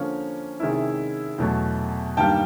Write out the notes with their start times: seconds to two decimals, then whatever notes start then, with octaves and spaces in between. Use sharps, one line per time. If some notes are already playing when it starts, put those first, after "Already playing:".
Already playing: D3 F3 A#3 C#4
0.60 C3 D#3 G#3 C#4 E4
1.38 E2 B2 F#3 A3
2.17 G2 D#3 G3 A#3 G5 A5